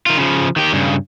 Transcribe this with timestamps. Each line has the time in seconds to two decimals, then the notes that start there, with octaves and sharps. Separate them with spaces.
0.06 D#3 F4
0.18 C#3 F3
0.56 D#3 G4
0.73 G2 C#3